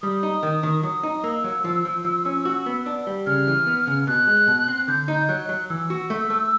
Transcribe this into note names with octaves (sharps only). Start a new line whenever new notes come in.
G3 D#6
D#4
D#3
D#3
F#3 D#6
D#4
A#3 E6
F#3
F3
F3
F3
C#4
F#4
B3
D4
G3
C#3 F6
E3
B3
C#3
B2 F#6
G#3
B2
C4
D3 G6
D#4
F#3 F#6
F#3
E3 E6
F#4
A3
A3